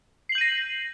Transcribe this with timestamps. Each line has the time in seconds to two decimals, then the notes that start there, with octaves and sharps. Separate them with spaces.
0.29 C7
0.32 F#7
0.35 G6
0.38 D#7
0.41 A#6